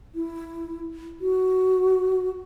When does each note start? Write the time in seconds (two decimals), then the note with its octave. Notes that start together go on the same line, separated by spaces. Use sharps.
0.15 E4
1.21 F#4